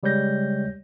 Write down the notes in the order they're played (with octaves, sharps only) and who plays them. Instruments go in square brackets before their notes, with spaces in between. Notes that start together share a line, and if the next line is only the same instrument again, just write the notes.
[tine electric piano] C#3 G3 G#3 C#5 G6 A#6